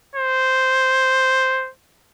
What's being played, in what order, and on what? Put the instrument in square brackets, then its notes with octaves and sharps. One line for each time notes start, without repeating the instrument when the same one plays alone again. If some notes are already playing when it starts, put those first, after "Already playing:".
[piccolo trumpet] C5